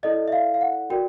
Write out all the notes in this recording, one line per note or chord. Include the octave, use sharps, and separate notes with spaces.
E4 A4 D5 D#5
E5
F5
F5
F#5
F#4 A#4 D5 G5